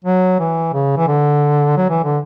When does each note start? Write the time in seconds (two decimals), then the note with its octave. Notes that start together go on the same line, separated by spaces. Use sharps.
0.04 F#3
0.40 E3
0.74 C#3
0.97 E3
1.08 D3
1.77 F#3
1.90 E3
2.04 D3